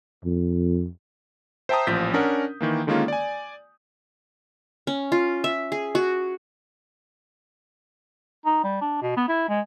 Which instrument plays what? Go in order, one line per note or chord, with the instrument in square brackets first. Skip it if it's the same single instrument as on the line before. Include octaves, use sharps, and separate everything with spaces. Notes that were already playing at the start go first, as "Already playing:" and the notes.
[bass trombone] F2
[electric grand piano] C5 E5 G5 A5 A#5 D#6
A1 A#2 F3 G6 B6
C#4 D4 A#4 F#5
D#3 E3 A#3
D3 D#3 G#3 A#3 C#4 F4
D5 G#5
[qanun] C#4
F4
E5
G#4
F#4
[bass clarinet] D#4
G3
D4
B2
B3
E4
G#3